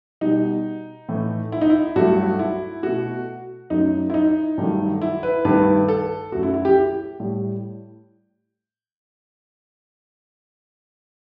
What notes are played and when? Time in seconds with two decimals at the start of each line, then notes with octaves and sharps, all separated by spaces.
0.21 B2 G3 D#4
1.09 A2 E3 A3
1.52 E4
1.61 D#4
1.70 E4
1.96 G2 F#3 A3 F#4
2.39 E4
2.83 B2 A3 F#4
3.70 F#2 F#3 A3 D#4
4.10 E4
4.14 D#4
4.58 G2 D#3 F#3 A3
5.02 E4
5.23 B4
5.45 G2 D#3 A3 B4
5.88 A4
6.32 F#2 F#3 A3 F#4
6.43 E4
6.54 E4
6.65 G4
7.20 A2 G3